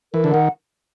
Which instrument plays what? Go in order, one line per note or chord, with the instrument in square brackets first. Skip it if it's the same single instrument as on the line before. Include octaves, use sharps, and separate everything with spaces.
[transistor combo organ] E3 [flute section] A#4
[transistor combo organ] D3
[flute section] F#5
[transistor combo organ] D#3